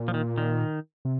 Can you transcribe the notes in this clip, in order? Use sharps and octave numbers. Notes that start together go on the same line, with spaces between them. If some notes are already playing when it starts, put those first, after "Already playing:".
Already playing: A#2
F3
D#3
D#3
C3